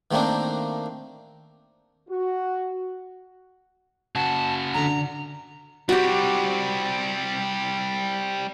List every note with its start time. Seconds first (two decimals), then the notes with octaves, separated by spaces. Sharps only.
0.11 D#3 A3 A#3 C4 D4
2.09 F#4
4.15 C#3 F#4 A5
4.74 D3 A#5
5.89 G3 C4 F#4 G4